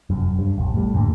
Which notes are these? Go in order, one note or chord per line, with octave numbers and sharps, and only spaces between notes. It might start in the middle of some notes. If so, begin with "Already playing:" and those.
F1 F#2
G2
E1 A#1
A2 G3
F2 G#2 D3 A#3